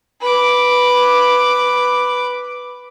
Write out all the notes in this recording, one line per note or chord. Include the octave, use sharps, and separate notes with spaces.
B4 D6